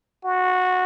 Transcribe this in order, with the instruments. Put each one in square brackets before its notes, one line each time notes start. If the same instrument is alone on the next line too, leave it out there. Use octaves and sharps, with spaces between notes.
[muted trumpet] F#4